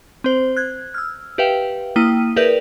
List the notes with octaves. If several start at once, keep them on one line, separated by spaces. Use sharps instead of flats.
C4 C5
F#6 G#6
E6 F6
G4 B4 E5 F5 G5
A#3 E4 G5 D#6 D#7
G#4 A#4 B4 D5 E5 G6